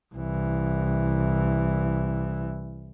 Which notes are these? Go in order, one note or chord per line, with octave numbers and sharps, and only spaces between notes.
C2 E3